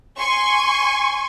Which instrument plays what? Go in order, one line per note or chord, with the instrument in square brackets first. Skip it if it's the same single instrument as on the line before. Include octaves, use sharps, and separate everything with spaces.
[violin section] G#5 C6 C#6